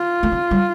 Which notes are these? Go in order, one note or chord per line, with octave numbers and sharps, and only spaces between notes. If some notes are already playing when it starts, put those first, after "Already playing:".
Already playing: F4
A3
C4
G3